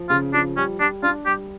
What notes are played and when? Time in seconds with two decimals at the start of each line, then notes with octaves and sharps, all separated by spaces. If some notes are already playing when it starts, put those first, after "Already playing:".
Already playing: F3
0.10 C#3 F4
0.34 F3 D4
0.57 G3 C#4
0.80 G3 D4
1.03 D4 F4
1.26 G3 G4